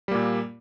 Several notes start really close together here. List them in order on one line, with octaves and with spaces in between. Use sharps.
G3 A#3 A#2